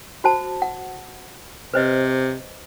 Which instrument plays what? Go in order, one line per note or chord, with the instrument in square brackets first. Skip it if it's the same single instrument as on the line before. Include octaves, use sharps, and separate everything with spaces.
[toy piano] F#4 C5 A5
F#5
[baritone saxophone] C3 [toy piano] B4 C5 D#5